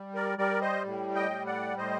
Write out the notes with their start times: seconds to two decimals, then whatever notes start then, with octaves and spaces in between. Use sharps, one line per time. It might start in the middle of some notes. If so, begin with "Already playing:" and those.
Already playing: G3
0.15 A#4 D5
0.38 G3 A#4 D5
0.61 C5 D#5
0.85 A2
1.15 D#5 G5
1.31 G3
1.46 D5 F#5
1.77 A2 C5 D#5